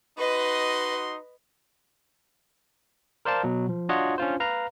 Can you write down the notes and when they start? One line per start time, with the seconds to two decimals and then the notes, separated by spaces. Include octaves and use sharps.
0.18 D#4 F#4 B4 D#5 C6
3.25 A#4 C5 D5 F5 A5
3.44 B2 F#3
3.69 F3
3.89 D4 F4 F#4 C#5 D#5 F#5
4.18 C#4 D4 F4 C5
4.40 B4 F5 A#5